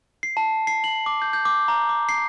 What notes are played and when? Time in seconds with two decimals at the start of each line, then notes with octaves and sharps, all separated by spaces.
0.23 C7
0.37 A5
0.67 C7
0.84 F#7
1.06 D6
1.22 G6
1.33 G6
1.45 D6
1.68 A#5
1.89 D6
2.09 C7